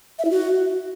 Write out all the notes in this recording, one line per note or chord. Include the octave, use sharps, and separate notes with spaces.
E5
E4
F#4